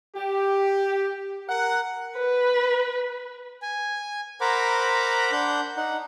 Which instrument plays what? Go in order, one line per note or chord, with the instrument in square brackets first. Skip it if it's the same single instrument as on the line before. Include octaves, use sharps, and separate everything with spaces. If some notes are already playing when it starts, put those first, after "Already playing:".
[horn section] G4
A#4 F#5
[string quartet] B4
[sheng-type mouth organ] G#5
A#4 C5 F#5 A#5 B5 D6
D4 F#5 G6
D#4 F#5